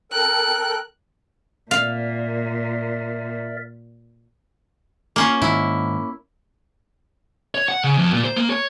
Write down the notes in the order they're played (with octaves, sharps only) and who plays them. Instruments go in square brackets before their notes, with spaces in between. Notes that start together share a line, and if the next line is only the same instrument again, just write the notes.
[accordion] A4 A#4 G5 [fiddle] F#6
[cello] A#2 [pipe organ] A#4 D5 E5 [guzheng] F5
[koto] A#3 C#4 F4
[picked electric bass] G#2 D#3 [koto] E4
[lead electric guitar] C#5
F#5
C#3
F2
A#2
C5
A#3
C#5